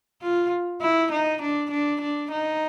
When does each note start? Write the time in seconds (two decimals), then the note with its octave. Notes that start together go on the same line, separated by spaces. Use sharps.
0.23 F4
0.81 E4
1.12 D#4
1.42 D4
1.70 D4
2.01 D4
2.31 D#4